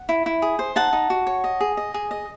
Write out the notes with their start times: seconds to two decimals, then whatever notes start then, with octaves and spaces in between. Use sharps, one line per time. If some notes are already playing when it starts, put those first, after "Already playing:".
Already playing: F#5
0.09 E4
0.26 E4
0.42 G#4
0.59 C5
0.76 D#4 F#5 A5
0.93 D#4
1.10 F#4
1.27 C#5
1.44 D#5
1.60 G#4
1.77 D#5
1.94 G#4
2.11 D#5